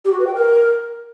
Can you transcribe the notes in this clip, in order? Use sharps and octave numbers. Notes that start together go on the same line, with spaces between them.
G4
F#4
B4
G5
A#4